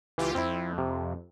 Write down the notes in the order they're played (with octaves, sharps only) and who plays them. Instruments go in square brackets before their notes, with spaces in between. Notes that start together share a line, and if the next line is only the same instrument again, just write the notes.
[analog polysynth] C#2 F4 G4 [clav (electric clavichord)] E3
[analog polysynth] F2 [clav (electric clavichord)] C4 E4
[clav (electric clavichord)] C3